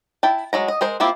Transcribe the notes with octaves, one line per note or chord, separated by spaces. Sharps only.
E4 G5 A5
F#3 G#3 A#5
D#5
G#3 A#4 C5
A#3 C4 E4 F4 G4